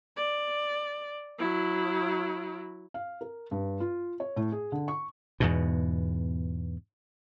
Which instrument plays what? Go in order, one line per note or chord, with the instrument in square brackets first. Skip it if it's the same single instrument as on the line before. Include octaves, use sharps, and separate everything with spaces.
[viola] D5
F#3 E4
[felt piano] F5
A#4
G2
F4
C#5
A2
G#4
D3
C#6
[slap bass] E2 G#2 B2